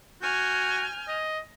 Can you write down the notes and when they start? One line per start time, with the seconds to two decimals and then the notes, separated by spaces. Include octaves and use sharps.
0.22 F#4 G#5 F6 G6
1.08 D#5